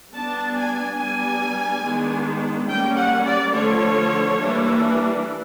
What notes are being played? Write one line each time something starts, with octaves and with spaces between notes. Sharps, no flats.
G3 B3 D4 A5
G#5
G3 B3 D4 G#5
D#3 G#3 B3 D4
G3 A#3 C#4 G5
F#5
D5
D3 F3 A3 C#5
E3 G3 A#3 D4